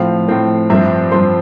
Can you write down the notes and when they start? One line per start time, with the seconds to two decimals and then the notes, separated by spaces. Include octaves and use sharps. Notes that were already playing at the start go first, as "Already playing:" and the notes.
Already playing: A2 F3 C4 F5
0.28 A2 F3 C4
0.70 G2 F3 C4 E5
1.12 G2 F3 C4 C6